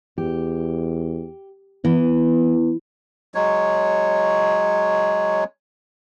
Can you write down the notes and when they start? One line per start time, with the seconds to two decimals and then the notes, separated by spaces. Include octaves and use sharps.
0.18 E2 G4
1.85 E3 B3
3.35 F#3 G#3 C#5